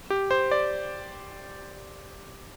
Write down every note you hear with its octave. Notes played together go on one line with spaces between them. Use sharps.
G4
C5
D5